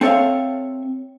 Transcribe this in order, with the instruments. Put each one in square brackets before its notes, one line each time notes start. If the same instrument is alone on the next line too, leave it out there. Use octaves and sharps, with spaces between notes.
[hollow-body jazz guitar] C4 A4 C#5 E5 F5